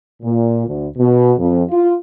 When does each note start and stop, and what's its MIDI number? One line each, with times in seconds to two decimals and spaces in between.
0.23 0.66 46
0.67 0.86 38
0.97 1.33 47
1.38 1.63 41
1.70 1.94 65